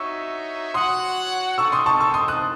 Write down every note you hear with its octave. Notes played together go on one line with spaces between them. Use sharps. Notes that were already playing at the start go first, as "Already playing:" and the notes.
Already playing: D#4 F#4 C#5 E5 C#6 E6
F#4 C#5 F#5 C6 D#6
C4 D#4 A4 C#6 E6
C6 D#6
A5 C#6
C#6 E6
C6 D#6
D#6 F#6